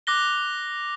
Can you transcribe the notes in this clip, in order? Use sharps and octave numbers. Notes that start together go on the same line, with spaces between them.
D6 F#6 A#6 G7